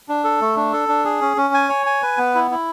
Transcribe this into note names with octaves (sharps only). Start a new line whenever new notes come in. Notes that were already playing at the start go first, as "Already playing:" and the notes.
D4
A4
A3
D4
A4
D4
G#4
C#4
C#4
G#5
C#5
G#5
B4
B3
E4
E4